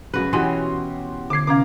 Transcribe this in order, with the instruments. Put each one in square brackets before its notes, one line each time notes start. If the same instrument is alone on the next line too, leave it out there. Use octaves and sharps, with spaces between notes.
[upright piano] F#2 C#3 [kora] F#4 B4
[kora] B2 E3 C#4 [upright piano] F#4 G4 C6
[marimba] D3 G#6 [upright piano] D6 C7
[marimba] C3 C#4 G#6 [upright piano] F5 A#5 D6